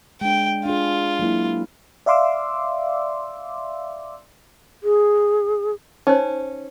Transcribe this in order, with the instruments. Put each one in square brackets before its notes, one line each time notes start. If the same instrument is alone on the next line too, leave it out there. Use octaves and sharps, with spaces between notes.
[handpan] G#3 D4 [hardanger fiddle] G5
[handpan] D4 G#4 [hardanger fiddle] F4
[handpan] F#3 A#3 E4
[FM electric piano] D5 E5 F5 C6 D6 E6
[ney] G#4
[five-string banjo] C#4 [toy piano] D#4 C5